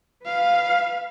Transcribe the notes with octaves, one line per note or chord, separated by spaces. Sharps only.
B4 F5